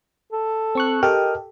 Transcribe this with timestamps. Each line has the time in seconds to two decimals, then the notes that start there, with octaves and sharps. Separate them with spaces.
0.32 A4
0.75 C4 C#6 F#6
1.03 G4 A4 A#4 D#5 G5 F6